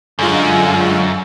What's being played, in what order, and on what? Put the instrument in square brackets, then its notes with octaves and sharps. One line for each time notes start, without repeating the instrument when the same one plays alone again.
[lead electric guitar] F#2 [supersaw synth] D3 G#3 F4